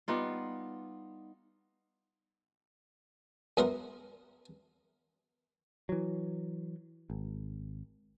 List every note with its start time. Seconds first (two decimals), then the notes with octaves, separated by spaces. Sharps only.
0.08 G3 B3 D#4 F4
3.57 F#2 B3 A#4 F#5 A#5 C6
5.89 E3 F#3
7.10 G#1